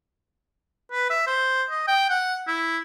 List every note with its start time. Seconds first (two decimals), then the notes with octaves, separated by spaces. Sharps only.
0.92 B4
1.10 E5
1.27 C5
1.70 D#5
1.87 G5
2.10 F#5
2.47 E4